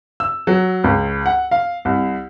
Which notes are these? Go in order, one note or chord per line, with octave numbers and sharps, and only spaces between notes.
E6
F#3
C#2
F#5
F5
C2